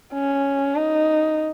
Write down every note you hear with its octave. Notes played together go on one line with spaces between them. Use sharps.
C#4
D#4